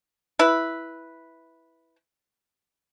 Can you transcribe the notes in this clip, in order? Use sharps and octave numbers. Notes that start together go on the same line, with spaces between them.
E4 B4